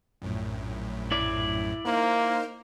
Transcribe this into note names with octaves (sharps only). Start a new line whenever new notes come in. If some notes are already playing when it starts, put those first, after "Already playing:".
A#1 F#2 A2
E4 D5
A#3 D#4 A#4 C5